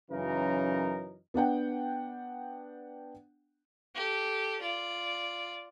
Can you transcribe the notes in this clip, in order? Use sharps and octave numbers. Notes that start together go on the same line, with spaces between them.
F#2 C#3 E3 F#3 D#4 A#4
B3 D4 F#5 G5
G4 A4
F4 D5